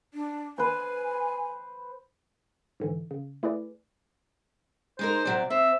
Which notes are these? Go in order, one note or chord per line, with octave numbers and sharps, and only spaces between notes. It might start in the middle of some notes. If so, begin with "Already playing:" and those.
D4
B4 C5 G#5
G#2 D3 E3
C#3
A3 E4 G#4 B4 D5
G#3 D#4 A#4 C5
C3 F#3 D5
C4 E5